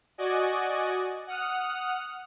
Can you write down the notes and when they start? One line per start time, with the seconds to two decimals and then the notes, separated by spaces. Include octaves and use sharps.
0.18 F#4 D5 D#5 G#5
1.27 F#5 D#6 F6